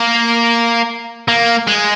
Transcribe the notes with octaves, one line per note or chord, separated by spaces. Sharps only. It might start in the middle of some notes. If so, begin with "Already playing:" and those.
Already playing: A#3
A#3
G#3